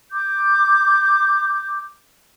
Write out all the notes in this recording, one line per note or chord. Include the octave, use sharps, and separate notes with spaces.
D6 G6